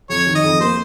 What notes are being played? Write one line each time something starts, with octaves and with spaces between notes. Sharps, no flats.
F2 C#5
D#3
D#5
F2
A#3 C5